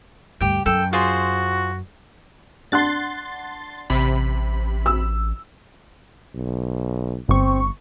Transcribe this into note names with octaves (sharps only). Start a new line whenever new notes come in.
D2 G2 G4 G5
F#2 A4 G5
F4 F#4 G#4 C5
D4 F#5 C6 F#6 A6
A1 C3 B5
E6
B1
G1 C4 C#6